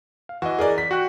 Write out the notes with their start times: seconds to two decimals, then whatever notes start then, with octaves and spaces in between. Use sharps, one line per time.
0.29 F5
0.42 E3 F#4 D#5
0.59 G#4 A#4 D5
0.78 B6
0.91 F#4 G5 F#6